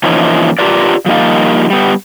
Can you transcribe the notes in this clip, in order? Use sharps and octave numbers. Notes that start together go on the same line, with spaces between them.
E3 F3 A#3 C#4 D#4
D4 F4 G4 A#4 B4 D5
F3 G3 A#3 D#4 F4
G3 B3